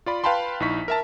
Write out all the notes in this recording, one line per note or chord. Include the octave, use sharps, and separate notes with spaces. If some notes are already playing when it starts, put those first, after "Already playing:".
F4 D5 B5
B4 F5 G5 A5 B5 C6
A#1 D#4 E4 C#6 B6
A#4 E5 A5